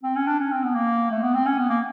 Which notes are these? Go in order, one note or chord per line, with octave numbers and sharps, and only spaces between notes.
C4
C#4
D4
C#4
C4
B3
A#3
A3
B3
C4
C#4
B3
A#3